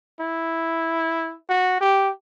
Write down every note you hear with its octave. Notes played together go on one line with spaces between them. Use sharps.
E4
F#4
G4